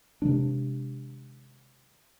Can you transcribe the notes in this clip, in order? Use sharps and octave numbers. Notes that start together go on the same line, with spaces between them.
C3 D#3 G#3 D4